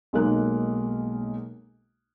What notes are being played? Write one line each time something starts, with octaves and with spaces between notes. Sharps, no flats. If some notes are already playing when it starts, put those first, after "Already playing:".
B1 G#3 A#3 F#6